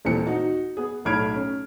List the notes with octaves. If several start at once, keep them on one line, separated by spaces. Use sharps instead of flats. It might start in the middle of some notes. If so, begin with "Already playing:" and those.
D#1 A#2 E3 C4 C#7
D#4 F#4
B3 G#4
B1 A2 B5 F6 G#6 D7
C#4